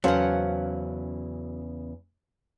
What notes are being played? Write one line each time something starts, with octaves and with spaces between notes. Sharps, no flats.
E2 C#3 F#3 C#4 A4 C5 F5 F#5